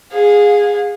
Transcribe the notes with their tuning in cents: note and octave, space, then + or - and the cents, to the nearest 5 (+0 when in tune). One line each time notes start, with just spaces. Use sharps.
G#4 -10 F5 +30